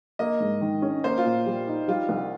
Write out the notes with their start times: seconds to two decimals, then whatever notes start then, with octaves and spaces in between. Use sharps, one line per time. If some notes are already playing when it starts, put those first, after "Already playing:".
0.19 A#3 D#5
0.40 G#2
0.61 D#3
0.82 C#4
1.04 A#3 C5
1.18 F4
1.25 A#2
1.46 G3
1.67 D#4
1.88 G3 F4
2.09 C2